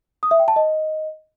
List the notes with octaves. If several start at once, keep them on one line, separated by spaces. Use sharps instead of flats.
D#6
E5
G5
A5
D#5